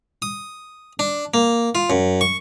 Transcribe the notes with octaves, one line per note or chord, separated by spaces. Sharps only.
D#6
D4
A#3
F4
F#2
C#6